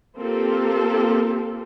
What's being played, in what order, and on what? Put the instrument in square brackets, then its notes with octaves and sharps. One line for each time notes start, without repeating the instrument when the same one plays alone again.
[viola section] A#3 C4 F4 G4 A4